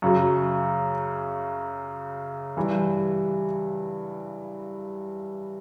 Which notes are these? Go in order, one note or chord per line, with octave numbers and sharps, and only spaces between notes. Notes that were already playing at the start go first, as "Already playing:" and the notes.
F#2 C#3 F#3
G2 E3 G3